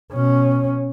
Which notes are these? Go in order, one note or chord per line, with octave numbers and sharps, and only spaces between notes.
B2 C#4